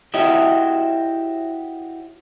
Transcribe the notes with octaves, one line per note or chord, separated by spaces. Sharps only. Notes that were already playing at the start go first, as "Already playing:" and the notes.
E4 F#4 G4 C#5 D#5 E5